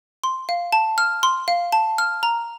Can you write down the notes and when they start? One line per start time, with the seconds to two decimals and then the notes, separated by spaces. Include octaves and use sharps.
0.24 C6
0.49 F5
0.72 A5
0.98 F6
1.23 C6
1.48 F5
1.72 A5
1.98 F6
2.23 A#5